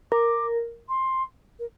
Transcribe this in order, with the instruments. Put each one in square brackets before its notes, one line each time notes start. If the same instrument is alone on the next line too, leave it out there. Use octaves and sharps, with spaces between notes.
[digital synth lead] A#4 [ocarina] D6
[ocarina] C6
A#4